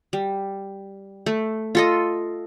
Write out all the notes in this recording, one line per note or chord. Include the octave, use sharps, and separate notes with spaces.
G3
A3
F4 A4 D#5